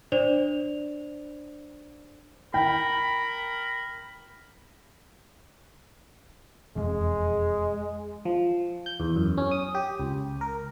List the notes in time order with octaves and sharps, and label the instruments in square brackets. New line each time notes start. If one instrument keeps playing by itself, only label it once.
[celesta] D4 C5 D5 F7
[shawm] A#4 [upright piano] G5 [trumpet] B5
[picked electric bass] E1 F2 [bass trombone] G#3
[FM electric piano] F3
G6
E2
F#2
C#4
D#6
G4
C#2
A#4